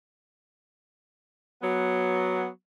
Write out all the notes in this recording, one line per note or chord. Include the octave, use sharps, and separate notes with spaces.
F#3 B3